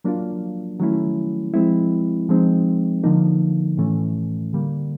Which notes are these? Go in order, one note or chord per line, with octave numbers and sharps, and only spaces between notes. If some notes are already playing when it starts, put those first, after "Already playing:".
F#3 A#3 D4 F4
D#3 F#3 A3 C#4 E4
F3 G#3 C4 E4
F3 G#3 C4 D#4
D3 F3 A#3 D#4
A2 E3 A3 C#4
D3 G3 A#3